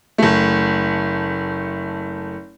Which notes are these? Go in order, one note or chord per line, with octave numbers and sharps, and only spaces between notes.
F#1 A3